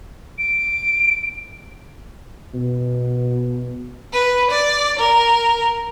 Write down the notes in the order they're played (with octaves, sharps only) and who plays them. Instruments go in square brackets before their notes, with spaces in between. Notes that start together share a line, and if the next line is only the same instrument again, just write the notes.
[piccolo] D7
[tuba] B2
[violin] B4
D5
A#4